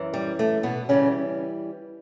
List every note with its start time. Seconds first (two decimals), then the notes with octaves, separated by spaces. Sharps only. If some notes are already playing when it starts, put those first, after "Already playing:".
Already playing: F#2 E3
0.14 G3
0.39 A3
0.63 B2 B3
0.89 C#3 E3 G3 C#4